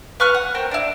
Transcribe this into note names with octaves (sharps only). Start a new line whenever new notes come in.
B4 C#6 F6 F#6
F#5
C4 A#4 G5
D4 E4